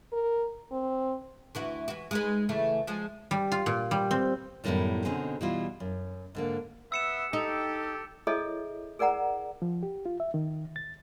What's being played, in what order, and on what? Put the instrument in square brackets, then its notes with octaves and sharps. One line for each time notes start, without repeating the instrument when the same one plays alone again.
[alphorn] A#4
C4
[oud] D2 E3 F#4
E3 F#4
G#3 D#4 B4
C#3 E3 A3
F3 G#3
[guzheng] G3
F4
A#2
G3
C4
[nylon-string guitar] F#2 A2 D#3 G3 B3 E4
B2 D3 C4 C#4 D#4 G#4
B2 E3 G3 E4 F4
F#2
G#2 D3 A#3
[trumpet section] B3 E5 [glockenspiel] E6 C#7 E7
[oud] D#4 [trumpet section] G4 [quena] A4
[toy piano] E4 G#4 A4 C#5 D#5 E5
G#4 A#4 D5 F#5 A#5
[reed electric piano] F3
G4
F4
E5
D#3
A6